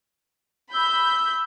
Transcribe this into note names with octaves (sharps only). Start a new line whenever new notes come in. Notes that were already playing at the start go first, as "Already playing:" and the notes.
B5 E6 G6